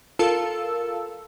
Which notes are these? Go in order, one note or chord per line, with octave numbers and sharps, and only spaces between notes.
F4 A4 A#4 F5 A5 E6